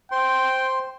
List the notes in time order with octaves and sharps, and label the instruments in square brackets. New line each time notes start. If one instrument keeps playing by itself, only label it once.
[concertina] C5 C6 [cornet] G5